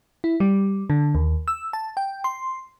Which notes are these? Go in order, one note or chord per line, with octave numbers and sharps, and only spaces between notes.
E4
G3
D3
D#2
E6
A5
G5
C6